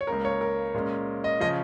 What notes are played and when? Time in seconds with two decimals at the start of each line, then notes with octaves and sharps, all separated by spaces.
0.01 C#5
0.07 C#2 C#3 A#3 A#4
0.25 C#5
0.41 A#4
0.74 A#2 G#3 C#4
1.24 D#5
1.40 C#3 F3 C#4 D#5